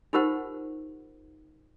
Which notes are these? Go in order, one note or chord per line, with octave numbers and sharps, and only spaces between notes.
D#4 F4 G4 A#4 C5 F#5